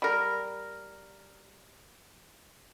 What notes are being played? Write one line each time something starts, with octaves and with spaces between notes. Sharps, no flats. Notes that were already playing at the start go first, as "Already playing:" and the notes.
G3 A#4